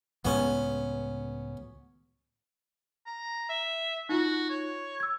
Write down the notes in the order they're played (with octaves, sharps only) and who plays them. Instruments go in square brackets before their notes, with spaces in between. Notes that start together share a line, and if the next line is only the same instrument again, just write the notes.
[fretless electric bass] C#2 A2 G#3 [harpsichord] B3 C#4
[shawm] A#5
E5
[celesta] D#4 F4 [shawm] F#4
[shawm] C#5
[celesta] E6 G#6